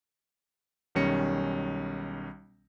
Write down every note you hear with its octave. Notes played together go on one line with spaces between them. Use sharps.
B1 D#3 G3 C#4 A#6 C#7